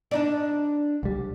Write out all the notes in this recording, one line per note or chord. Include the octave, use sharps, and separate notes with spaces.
D4 D#4 D5
C2 G3